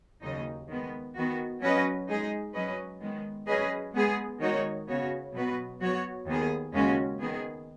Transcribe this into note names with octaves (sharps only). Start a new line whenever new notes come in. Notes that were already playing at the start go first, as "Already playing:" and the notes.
D#2 C#3 F#3 D#4
D#3 G#3 B3
D#3 B3 F#4
F#3 C#4 F#4 B4 D#5
G#3 D#4 G#4
F#3 C#4 B4 D#5
D#3 G#3 B3
F#3 C#4 G#4 B4 D#5
G#3 B3 G#4
D#3 G#3 D#4 F#4 C#5
C#3 B3 F#4 C#5
B2 F#3 B3 F#4 B4
F#3 B3 F#4 C#5
D#2 D#3 B3 G#4
D#2 C#3 G#3 C#4 F#4
D#3 B3 G#4